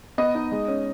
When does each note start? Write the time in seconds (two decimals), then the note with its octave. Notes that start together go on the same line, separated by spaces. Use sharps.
0.18 B3 D#5
0.35 D#4
0.52 G#3
0.68 C#4